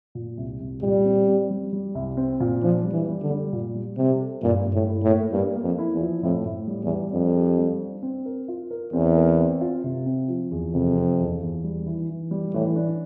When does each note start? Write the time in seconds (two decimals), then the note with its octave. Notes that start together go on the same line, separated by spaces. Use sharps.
0.15 A#2
0.37 C2
0.60 C2
0.82 A#2 G3
1.04 C4
1.28 C4
1.50 G3
1.73 G3
1.95 C2
2.17 C4
2.40 A#2
2.62 F3 D4
2.84 G3
2.93 E3
3.08 G3
3.22 D3
3.31 G3
3.53 A#2
3.75 G3
3.98 C3 G3
4.21 A4
4.43 G2 A#2
4.65 G2
4.73 A2
4.88 E4
5.03 A2
5.11 A#3
5.33 G2 A#3
5.56 A#3
5.63 F2
5.78 E4
5.93 E2
6.01 F3
6.23 F2 A2
6.45 A2
6.67 G3
6.83 E2
6.90 G3
7.13 F2 D4
7.36 G4
7.59 G3
7.81 D4
8.03 C4
8.26 A#4
8.48 F4
8.71 A#4
8.93 E2 C4
9.16 A#4
9.39 C4
9.61 F4
9.84 C3
10.06 C4
10.28 F3
10.51 E2
10.73 F2 C3
10.96 C4
11.19 E2
11.41 E2
11.64 G3
11.86 E3
12.09 E3
12.31 G3
12.54 A2 E3
12.76 D4